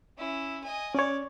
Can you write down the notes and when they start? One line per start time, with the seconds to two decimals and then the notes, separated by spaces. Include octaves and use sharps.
0.18 C#4 E4
0.64 D#5 G#5
0.95 C#4 C#5 D5